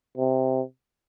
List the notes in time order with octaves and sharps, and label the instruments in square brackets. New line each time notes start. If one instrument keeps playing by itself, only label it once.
[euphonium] C3